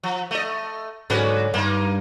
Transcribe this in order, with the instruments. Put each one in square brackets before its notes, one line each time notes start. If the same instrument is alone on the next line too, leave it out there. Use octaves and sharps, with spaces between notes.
[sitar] F3
A3 D#5
[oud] G#2 D3 F#3 [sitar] C#4 F#4 B4
[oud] G2 [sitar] A#3 D#4